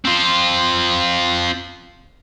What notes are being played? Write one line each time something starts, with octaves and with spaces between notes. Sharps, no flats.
C4 F4